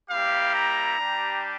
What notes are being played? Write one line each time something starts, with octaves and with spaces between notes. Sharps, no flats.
G3 A#3 E4 G4 F5
A#5
G3 D4 G4